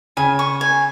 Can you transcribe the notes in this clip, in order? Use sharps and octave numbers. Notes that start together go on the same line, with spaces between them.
C#3 G#5
C#6
G#5